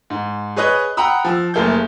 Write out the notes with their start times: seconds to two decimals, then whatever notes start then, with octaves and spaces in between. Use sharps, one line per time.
0.10 G#2
0.56 G#4 B4 C#5 D#5 D#6 F#6
0.97 F#5 G5 A#5 B5 D#6 E6
1.25 F3 E6
1.54 F#1 A3 A#3 G#4 A4 G6